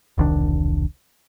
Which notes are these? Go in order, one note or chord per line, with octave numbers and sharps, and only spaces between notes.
E1 C2 D#3 D4